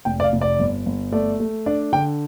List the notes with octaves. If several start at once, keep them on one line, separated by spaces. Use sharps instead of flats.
F1 G5
D5
F5
F1
D5
G1
G1
A3 D5
A3
D4 D5
D3 G5